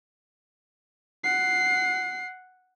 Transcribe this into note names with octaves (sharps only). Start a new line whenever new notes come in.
F#5 C7